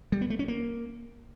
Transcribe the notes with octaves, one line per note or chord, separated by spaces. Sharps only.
G3
B3
A3
C#4
A#3